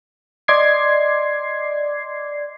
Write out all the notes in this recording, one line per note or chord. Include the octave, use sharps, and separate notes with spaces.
D5 D#5 C6 D6 G#6 C7